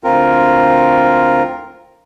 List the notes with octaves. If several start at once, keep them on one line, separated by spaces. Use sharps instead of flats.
D2 C4 F4 A#4